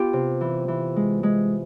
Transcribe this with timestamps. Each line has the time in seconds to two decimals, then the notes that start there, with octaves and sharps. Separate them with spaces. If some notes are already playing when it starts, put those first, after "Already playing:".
Already playing: B3 F4 G4
0.13 C3
0.41 E3
0.68 E3
0.96 G#3
1.23 G#3